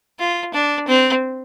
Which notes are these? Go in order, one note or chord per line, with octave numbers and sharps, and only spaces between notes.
F4
D4
C4